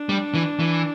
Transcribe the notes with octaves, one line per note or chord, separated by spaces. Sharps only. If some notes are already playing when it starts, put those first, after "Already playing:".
Already playing: D4
G3
E3
E3